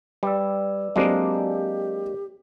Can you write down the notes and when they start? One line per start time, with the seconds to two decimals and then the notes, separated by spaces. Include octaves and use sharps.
0.23 G3 B4 D5 E6
0.96 F#3 G#3 A#3 C4 D4 G4